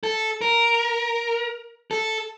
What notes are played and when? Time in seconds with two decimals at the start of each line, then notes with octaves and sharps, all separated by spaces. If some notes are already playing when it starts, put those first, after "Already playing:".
0.04 A4
0.41 A#4
1.91 A4